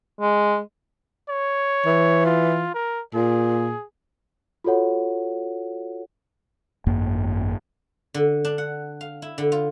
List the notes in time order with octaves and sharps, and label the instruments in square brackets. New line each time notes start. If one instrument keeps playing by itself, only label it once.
[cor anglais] G#3
[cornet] C#5
[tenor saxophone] E3
[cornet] F4
A#4
[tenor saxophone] A#2 [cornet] G#4
[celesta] F4 F#4 A4 C#5 F#5
[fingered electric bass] G#1 F#2 A#3
[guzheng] D3
D4
F#5
F5
E4
D3
F4